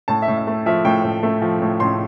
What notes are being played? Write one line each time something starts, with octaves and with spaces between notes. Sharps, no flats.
A2 A5
E5
A2
E5
A3
F3 E5
A2 G5
A2
A3
F3
A2
A2 C6